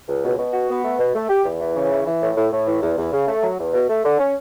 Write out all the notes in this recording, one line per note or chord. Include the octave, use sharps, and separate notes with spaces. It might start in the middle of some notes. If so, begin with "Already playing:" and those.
C#2
B2
B2
F#4
B3
A3
B2
A3
G4
E2
E3
C#3
E3
E3
A2
A2
A2
E3
E2
E2
C#3
A3
F#3
E2
B2
A3
D3
C#4